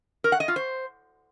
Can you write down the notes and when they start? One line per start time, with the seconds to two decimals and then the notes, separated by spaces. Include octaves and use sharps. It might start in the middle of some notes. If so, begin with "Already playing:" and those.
0.24 A#4
0.32 F#5
0.40 D#5
0.48 F4
0.56 C5